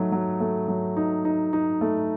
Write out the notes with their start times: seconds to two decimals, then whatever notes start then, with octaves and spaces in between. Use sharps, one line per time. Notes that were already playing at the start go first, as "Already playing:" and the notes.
Already playing: F#3 A3 D#4
0.12 F#3
0.40 A3
0.68 F#3
0.97 D#4
1.25 D#4
1.53 D#4
1.81 A3